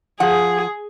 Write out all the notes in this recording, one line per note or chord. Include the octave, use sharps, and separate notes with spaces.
F3 G#4 F#5